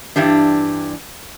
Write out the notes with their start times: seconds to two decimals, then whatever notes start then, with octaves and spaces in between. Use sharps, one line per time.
0.16 G2 E3 G3 D4